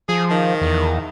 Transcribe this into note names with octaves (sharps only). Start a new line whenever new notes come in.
F3 G#4
D#3
E2